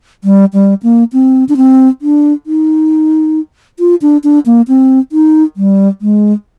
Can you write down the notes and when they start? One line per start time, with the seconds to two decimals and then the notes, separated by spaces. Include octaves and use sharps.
0.24 G3
0.54 G3
0.83 A#3
1.13 C4
1.49 D4
1.57 C4
2.02 D4
2.47 D#4
3.80 F4
4.02 D4
4.24 D4
4.46 A#3
4.68 C4
5.12 D#4
5.57 G3
6.02 G#3